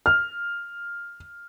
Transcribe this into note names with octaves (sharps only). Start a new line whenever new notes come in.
F6